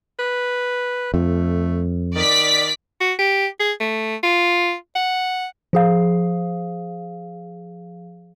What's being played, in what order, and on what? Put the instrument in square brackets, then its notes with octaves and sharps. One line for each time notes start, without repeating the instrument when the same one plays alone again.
[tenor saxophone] B4
[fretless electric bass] F2 [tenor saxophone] A3
[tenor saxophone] D#3 [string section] D5 B6
[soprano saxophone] F#4
G4
G#4
A3
F4
F#5
[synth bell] F3 G#4 F5